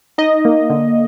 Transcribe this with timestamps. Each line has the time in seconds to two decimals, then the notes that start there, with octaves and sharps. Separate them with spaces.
0.18 D#4 D#5
0.45 A#3
0.70 D3